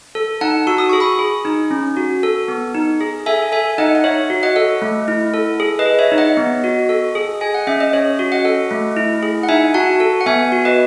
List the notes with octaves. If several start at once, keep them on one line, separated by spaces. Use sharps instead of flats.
A4
D#4 F#5 A5
F#4 E6
D#6
G#4 C#6
B5 D#6
G#4
D#4
C#4
F#4
A4
B3
D#4
G#4
A4 E5 G#5
A4 E5 G#5
D#4 D#5 F#5
F#5
D#4 C#5 E5
F#4
D#5 F#5
A4
A3
E4
A4
G#4
B4 D#5
G#4
C#5 E5
D#4
D#5 F#5
B3
F#4
A4
G#4
G#4 G#5
F#5
C#4 E5
D#5
C#4 C#5
F#4
D#5 F#5
A4
A3
E4
G#4
F#5
D#4 E5 G#5
F#4 F#5 A5
A4
F#5
B3 E5 G#5
F#4
B4 D#5